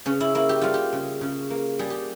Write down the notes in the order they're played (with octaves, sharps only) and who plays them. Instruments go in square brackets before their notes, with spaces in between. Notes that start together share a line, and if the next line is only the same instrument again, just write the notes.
[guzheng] C#3 C#4
E4
A#3 E4
G4
G3 F4
G4
C#3
C#3
A#3
G3 G#4
G4